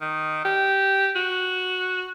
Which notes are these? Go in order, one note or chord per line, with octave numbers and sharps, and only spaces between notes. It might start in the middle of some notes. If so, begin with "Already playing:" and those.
D#3
G4
F#4